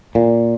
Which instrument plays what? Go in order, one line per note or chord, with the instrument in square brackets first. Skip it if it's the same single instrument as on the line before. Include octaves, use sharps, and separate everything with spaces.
[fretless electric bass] A#2